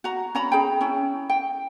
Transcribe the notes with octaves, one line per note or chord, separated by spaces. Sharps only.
F#4 A#5
C#4 A#5 B5
G#4 G5
C#4 E4
G5